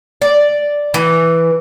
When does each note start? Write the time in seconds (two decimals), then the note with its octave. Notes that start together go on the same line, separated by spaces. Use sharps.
0.22 D5
0.94 E3